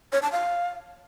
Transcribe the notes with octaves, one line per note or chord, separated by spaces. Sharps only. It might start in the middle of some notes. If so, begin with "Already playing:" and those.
C#5
A5
F5